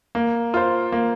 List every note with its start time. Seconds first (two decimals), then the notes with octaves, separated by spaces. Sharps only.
0.15 A#3
0.54 F4 C5
0.92 A#3